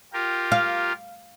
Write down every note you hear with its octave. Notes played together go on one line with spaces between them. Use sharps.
F4 G4 A#4
F5